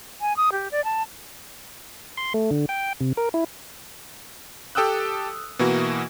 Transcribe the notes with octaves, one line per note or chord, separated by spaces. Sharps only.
G#5
D#6
G4
D5
A5
C6
A3
D3
G5
C3
A#4
E4
G4 A4 G5 D#6 E6 F#6
B2 E3 A#3 E4 F#4